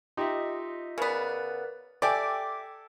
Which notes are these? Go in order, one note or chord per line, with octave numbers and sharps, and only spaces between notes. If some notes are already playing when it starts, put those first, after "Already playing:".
D#4 F4 G4 D#5 E5
C#3 B3 A#4 B4 D5
G4 A4 D5 E5 G5 G#5 D6